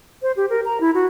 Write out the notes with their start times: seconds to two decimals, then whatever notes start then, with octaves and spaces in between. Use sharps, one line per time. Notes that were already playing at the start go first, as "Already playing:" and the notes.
0.22 C5
0.37 G4
0.50 A#4
0.65 A#5
0.81 E4
0.95 F#4